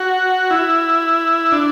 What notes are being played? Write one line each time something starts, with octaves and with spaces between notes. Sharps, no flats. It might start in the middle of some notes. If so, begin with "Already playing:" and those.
Already playing: F#4
E4
D4